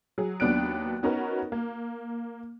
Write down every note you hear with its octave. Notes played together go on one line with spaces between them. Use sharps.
F#3 G#4
D#2 F#3 B3 D4 F#6 D7
B3 C#4 D#4 F#4 A#4 B4
A#3